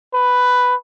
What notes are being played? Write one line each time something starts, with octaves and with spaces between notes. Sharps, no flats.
B4